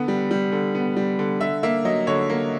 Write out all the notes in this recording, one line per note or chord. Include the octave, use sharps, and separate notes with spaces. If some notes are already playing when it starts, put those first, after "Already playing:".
Already playing: D3 B3
G3
G3
D3
B3
G3
D3
D3 E5
A#3 E5
F#3 D#5
D3 C#5
A#3